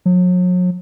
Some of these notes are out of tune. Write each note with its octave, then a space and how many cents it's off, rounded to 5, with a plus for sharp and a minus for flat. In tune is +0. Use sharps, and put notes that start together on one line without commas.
F#3 -40